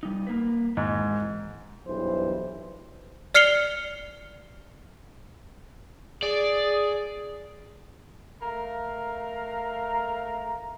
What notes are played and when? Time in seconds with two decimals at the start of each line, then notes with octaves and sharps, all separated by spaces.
0.03 G3 D#4
0.27 A#3 B4
0.77 G#2 D#3 E3 G#3
1.88 B1 G2 E3 C5
3.35 D5 F6 C7 C#7 F7 G7
6.23 G#4 D5
8.42 A3 A#4 F5 A#5